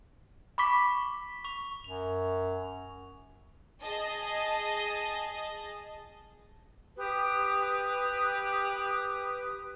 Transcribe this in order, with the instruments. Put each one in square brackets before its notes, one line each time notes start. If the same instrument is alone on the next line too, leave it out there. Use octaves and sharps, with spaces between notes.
[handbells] B5 C#6 D6 B6
[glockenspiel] C#6 F7
[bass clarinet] F#2 [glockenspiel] F7
[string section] G#4 D#5 A5
[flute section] G4 B4 D#6